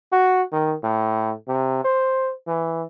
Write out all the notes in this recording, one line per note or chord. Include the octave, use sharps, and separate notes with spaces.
F#4
D#3
A2
C3
C5
E3